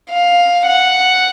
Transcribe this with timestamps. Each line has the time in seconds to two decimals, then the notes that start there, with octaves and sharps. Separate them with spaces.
0.10 F5
0.66 F#5